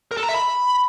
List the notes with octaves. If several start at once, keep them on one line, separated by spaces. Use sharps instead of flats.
A#4
A4
A#5
E5
B5